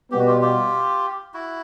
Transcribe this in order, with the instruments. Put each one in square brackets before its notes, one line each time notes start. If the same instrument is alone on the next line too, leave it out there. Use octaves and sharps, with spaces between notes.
[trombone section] B2 G3 B3 [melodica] G4
[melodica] F#4
F4 G4
F4 G4
E4 F#4